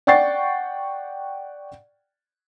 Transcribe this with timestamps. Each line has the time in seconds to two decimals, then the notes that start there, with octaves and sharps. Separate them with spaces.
0.07 D5 F#5 G5 C#6 A6 C7